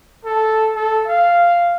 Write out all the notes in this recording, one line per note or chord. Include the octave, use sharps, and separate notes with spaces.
A4
A4
F5